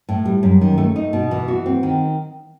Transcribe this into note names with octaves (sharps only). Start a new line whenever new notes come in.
A2
G3
F#2
D#3
A3
D#4
B2
E3
F#4
C4
D#3